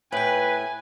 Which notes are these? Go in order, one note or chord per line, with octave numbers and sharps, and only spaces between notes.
A2 B4 G5 G#5